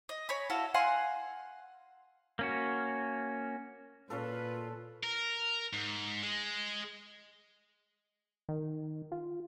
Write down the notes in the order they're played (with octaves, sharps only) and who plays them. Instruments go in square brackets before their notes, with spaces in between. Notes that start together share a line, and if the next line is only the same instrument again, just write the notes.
[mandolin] D#5
C#5 G#5 B5
E4 F#4 A4 F5
F5 F#5 G#5 C6
[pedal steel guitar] A#3 C#4 F#4
[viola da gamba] A#2 [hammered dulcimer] C#4 A4 [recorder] F4 [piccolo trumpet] B4
[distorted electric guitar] A#4
G#2
G#3
[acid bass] D#3
F4